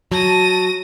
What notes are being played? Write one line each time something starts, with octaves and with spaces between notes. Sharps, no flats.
F#3 A5 A#6 D#7